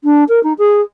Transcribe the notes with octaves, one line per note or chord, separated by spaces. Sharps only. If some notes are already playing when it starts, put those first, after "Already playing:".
D4
A#4
D#4
G#4